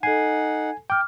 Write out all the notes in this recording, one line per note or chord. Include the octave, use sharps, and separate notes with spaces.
D#4 A4 F#5 G#5 C7
G5 D6 F6